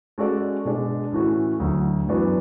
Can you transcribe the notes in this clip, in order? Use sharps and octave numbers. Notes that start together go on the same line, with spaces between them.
G#3 C#4 F#4 A4 D5
B2 G#3 D4
A2 E3 A3 C#4 F#4
D2 D3 F#3
F#2 E3 B3 D4 F#4